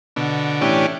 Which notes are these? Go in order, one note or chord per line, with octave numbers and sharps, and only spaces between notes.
B2 D3
A2 E3 C#4 D4 G4